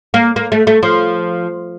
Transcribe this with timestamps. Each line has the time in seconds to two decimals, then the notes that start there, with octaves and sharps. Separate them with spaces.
0.14 A#3
0.36 A#3
0.52 A3
0.67 A3
0.83 F3